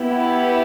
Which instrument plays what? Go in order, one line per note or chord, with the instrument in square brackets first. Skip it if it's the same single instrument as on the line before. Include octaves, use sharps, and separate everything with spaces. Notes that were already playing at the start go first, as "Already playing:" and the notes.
Already playing: [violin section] B3 E4 G4